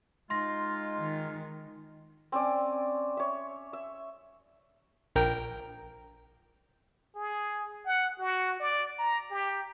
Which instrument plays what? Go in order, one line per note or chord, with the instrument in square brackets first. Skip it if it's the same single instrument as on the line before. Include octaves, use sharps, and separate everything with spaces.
[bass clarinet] G#3 [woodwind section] D#4 F4 [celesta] C6 A#6
[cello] D#3
[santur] C4 C#4 D5 G#5
C#5 E5
E5
[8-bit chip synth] A#1 A#4 G5
[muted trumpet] G#4
F#5
F#4
D5
A#5
G4